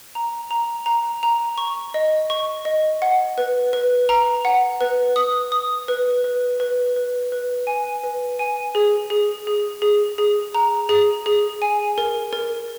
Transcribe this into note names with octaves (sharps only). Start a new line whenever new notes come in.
A#5
A#5
A#5
A#5
C#6
D#5
C#6
D#5
F#5
B4
B4
A#5
F#5
B4
D#6
D#6
B4
B4
B4
B4
B4
G#5
B4
G#5
G#4
G#4
G#4
G#4
G#4
A#5
G#4
G#4
G#5
A#4
A#4